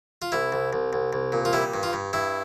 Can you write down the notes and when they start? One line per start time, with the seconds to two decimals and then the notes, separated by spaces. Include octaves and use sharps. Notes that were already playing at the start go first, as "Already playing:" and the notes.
0.22 F4
0.32 C2 E4
0.52 C2
0.73 C2
0.93 C2
1.13 C2
1.32 A#2
1.45 F4
1.53 G3 E4
1.74 G2
1.83 F4
1.93 G2
2.13 G2 E4